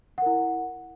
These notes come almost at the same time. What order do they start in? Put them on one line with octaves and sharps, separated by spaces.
F#5 A#4 E4